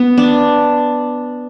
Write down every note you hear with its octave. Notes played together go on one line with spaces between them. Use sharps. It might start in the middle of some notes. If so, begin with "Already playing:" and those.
Already playing: B3
D4